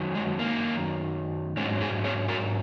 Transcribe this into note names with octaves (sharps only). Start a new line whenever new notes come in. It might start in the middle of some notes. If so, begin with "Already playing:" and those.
Already playing: F#2 D#3 F#3
G#3
A#3
G#2 F#3 G#3 C#4
D#4 G#4
G#4 C#5
F#4 A#4